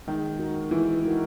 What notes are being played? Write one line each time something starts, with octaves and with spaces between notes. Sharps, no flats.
D#3 G#3
D#4 F#4 A#4
E3 G#3
D#4 F#4 A#4